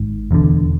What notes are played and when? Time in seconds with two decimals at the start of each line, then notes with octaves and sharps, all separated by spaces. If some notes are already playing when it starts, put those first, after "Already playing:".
Already playing: G#1 G#2
0.31 E1 E2 D3